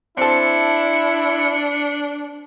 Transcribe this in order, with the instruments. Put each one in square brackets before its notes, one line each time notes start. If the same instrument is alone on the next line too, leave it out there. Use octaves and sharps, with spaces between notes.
[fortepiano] C4 A4 [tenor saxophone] D4 [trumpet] E4 [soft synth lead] C#7